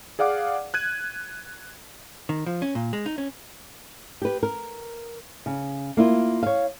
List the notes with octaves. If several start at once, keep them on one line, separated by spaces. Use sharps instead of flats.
G#4 D5 F5 F#5 D6
F#6 G#6 D#7
D#3
F3
C#4
A#2
G#3
D#4
C#4
G4 B4
A#4
C#3
A#3 E4 F4
C#5 F5